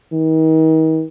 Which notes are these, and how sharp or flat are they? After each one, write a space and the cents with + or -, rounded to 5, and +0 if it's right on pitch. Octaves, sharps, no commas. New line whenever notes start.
D#3 +40